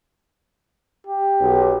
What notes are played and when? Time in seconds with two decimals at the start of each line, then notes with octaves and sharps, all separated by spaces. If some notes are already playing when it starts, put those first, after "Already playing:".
1.07 G4
1.40 B1